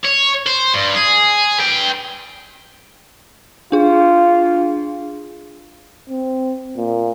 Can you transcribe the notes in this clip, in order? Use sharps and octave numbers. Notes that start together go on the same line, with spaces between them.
C#5
C5
G2
G#4
B4 G5
D4 F4 G#4
C4
A#2